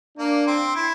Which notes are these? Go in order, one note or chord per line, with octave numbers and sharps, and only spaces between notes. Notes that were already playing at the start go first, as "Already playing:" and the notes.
A#3 D4
C4
E4